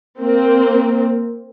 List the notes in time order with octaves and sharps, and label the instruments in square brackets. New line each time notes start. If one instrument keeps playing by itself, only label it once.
[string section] A#3 C4